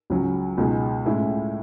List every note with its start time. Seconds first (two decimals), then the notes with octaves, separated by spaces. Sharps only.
0.10 C#2 C#3 F#3 C#4
0.58 C#2 B2 G#3 D#4
1.06 A2 G#3 C#4 E4